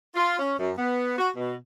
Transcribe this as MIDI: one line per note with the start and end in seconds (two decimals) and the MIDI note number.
0.15 0.37 65
0.39 0.53 61
0.59 0.71 42
0.78 1.17 59
1.18 1.30 66
1.36 1.54 47